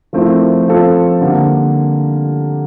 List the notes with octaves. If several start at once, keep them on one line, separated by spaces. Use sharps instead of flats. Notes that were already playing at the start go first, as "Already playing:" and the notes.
F3 A3 C4 E4 A#4
F3 C4 F4 A4
D3 G3 A#3